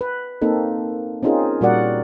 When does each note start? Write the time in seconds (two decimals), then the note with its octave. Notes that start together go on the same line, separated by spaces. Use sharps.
0.01 B4
0.41 A#3 C4 D#4 A4
1.23 C4 C#4 D#4 F4 G#4 A#4
1.61 A#2 G3 F#4 A#4 D5 F#5